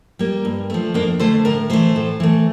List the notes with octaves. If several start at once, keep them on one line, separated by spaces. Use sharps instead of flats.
G3 A#3
G2
F3 A3
F2 A#3 D4
D3 A3 A4 C5
A2 A#4 D5
E3 A3 A4 C5
A2
E3 A3